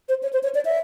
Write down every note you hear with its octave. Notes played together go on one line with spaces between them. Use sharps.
C5
C#5
C5
C#5
D5
E5